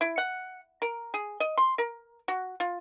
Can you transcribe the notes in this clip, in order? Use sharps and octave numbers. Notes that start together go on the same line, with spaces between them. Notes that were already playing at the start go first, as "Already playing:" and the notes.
E4
F#5
A#4
G#4
D#5
C6
A#4
F#4
F4